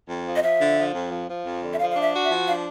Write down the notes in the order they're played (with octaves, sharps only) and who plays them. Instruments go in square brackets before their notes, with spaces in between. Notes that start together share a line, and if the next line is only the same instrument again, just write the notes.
[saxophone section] F2
F3
[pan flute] D#5
[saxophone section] F3 [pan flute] E5
[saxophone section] D3
F3
F2
F3
F3
F2
D3
[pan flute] E5
[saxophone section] F3 [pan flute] F5
[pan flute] F5
[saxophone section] D4
[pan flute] E5
[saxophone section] F#4
[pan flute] E5
[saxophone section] F3
[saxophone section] D4 [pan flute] F5